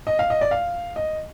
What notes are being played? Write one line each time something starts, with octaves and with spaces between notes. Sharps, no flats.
D#5
F5
D#5
D5
F5
D#5